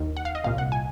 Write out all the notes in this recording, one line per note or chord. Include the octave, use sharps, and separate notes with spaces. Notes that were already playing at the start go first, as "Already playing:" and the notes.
Already playing: D#2 D#3
F#5
F5
D#5
C2 A#2 F5
F#5
G#5